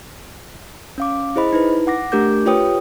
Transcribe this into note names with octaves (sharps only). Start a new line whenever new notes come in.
C#4 F5 D6
E4 G#4 C5 D#5 B5
D#4 E4 B4
F#5 D6 A#6
A3 D4 G4 A#4 D6 G6
F4 G4 B4 C#5 G5 D#6